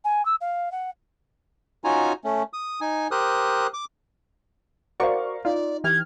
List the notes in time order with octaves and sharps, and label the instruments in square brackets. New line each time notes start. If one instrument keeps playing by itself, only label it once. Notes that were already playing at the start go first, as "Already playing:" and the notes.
[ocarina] G#5
E6
F5
F#5
[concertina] C#4 D#4 F4 F#4 G#5 A#5
A3 C#4
D#6
D#4 G#5
G4 A#4 C5 D#6 F#6
D6
[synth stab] F#4 D5 C#6 [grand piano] A#4 C5 F5
[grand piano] D#4 [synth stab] F4 [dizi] D5
[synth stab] E3 G4 F6 [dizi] G#6